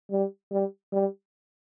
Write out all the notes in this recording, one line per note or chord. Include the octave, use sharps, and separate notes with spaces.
G3
G3
G3